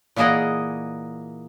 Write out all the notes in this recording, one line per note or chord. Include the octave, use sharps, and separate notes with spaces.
A#2 E3 A#3 G#4 D#5 F#5